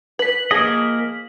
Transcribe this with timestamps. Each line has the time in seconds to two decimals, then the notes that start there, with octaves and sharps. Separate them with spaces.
0.19 B4 B6 F#7
0.51 F3 A#3 G#4 D#5